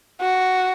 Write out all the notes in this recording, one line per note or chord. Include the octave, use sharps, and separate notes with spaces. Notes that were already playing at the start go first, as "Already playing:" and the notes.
F#4